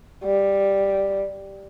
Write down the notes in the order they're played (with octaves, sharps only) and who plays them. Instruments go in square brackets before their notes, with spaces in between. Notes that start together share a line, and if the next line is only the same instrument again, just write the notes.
[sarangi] G3